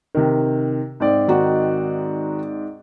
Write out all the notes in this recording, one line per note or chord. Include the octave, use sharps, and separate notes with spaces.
C3 D#3
G#2 C4 D5
D#3 D#4 F#4